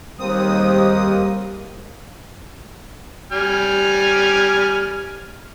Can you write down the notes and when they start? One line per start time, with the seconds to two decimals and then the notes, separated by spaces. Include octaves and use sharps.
0.20 D#2 G3 G#3 A#3 C4 D#6
3.32 G3 G#5 F6